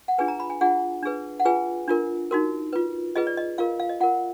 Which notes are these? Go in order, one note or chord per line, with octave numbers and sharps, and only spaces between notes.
F#5
D4 F4 G#4 B4 G#5
A#5
B5
G#5
D4 F4 G#4 F#5
D4 G#4 B4
F#5
F4 G#4 B4 G#5
D4 F4 A#4
D#4 F#4 A#4
F4 B4
F4 G#4 B4 D#5
D5
D#5
F4 A#4 F5
F5
D#5
F4 A#4 F#5